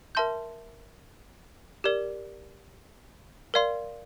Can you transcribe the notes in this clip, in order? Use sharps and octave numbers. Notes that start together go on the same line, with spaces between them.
A#4 E5 A5 C6 G6
G4 A#4 D5
A#4 D5 F5 C6